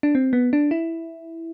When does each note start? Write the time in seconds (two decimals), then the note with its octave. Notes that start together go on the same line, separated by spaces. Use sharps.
0.03 D4
0.15 C4
0.33 B3
0.53 D4
0.71 E4